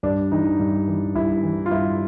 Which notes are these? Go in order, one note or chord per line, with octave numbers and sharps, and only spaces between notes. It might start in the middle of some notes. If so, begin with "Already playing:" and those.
G2 D4
E3 D#4
G2
E3
G2 E4
E3
F4
G2 E4